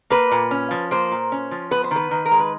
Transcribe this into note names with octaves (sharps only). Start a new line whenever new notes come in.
A#3 B4
A#2
C#4
F3
A#3 C5
A#2
C#4
F3
B3 B4
C5
D#3 B4
D#3
A#4
G#3
B4